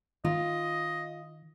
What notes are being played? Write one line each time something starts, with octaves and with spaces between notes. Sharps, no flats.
D#3 F4 D#5